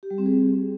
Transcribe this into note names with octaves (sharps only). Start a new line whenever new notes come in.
G4
G3
C4
G#4